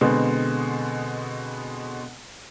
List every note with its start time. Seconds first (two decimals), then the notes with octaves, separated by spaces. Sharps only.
0.01 B2 D3 G#3 B3 C4